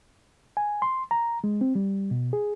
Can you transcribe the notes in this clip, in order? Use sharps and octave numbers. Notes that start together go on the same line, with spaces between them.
G#5
C6
A#5
G#3
C4
G3
B2
G#4